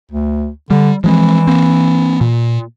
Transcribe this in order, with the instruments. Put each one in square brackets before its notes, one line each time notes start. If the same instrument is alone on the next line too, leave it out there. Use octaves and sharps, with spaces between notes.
[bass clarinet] D2
[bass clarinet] D3 [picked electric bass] G3
[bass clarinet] E3 [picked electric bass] F3 G#3 C4
[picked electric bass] A#3 C4
A#2